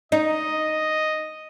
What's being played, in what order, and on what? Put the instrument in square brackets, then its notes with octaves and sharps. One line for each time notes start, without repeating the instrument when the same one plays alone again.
[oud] D#4 [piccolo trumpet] D#5